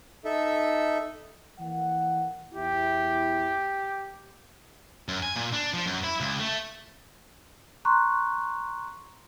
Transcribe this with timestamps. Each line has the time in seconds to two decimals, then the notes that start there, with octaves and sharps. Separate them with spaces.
0.25 D#4 A4 E5
1.59 E3 A#3 F#5
2.53 E2 E4 G4
5.08 F#2
5.23 G#5
5.36 A#2
5.53 D4
5.74 F3
5.86 F#2
6.04 E4
6.20 C#2
6.39 A3
7.85 A#5 C6 C#6 F#6